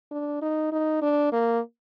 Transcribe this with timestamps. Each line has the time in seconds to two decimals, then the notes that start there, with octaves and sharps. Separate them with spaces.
0.11 D4
0.42 D#4
0.72 D#4
1.02 D4
1.32 A#3